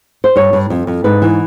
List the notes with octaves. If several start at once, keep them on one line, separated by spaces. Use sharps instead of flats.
C5
G2 C#5
G2
F2
F2
G#2 B4
E3